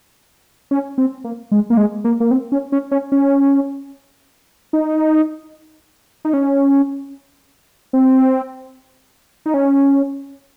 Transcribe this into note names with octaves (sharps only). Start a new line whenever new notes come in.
C#4
C4
A#3
G#3
A#3
G#3
A#3
A#3
C4
C#4
C#4
C#4
C#4
D#4
D#4
C#4
C4
D#4
C#4